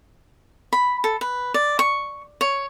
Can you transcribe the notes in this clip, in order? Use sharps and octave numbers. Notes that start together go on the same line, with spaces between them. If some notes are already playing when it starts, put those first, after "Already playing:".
B5
A4
B4
D5
C#6
C#5